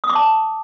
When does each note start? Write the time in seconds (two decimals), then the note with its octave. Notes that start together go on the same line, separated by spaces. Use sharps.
0.04 D#6
0.10 D6
0.15 A5